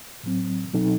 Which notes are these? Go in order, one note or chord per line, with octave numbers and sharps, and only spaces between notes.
A2 F#3 C4
B2 F#3 C4 D#4 A4